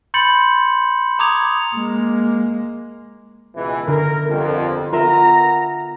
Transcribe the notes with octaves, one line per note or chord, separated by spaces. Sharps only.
B5 C6 G6 A6 C#7 F#7
A#5 D6 D#6 G#6 F7
G#3 A#3
C#2 B2 E3
D3 A#4
G1 F2
B3 F4 A#4 E5 A#5